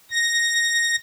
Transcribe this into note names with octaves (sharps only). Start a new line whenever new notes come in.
A#6